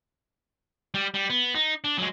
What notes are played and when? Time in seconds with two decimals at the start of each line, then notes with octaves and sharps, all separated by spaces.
0.94 G3
1.14 G3
1.30 B3
1.55 D#4
1.84 D4
1.98 F#3 G#3